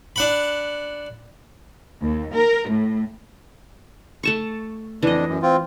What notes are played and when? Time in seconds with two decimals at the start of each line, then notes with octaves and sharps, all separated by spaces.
0.16 D4 F#5 B5
2.00 D#2
2.33 A#4
2.68 A2
4.23 A3 A5 C#6
5.03 F2 E3 D4 D#5
5.28 F#2
5.42 C4 F4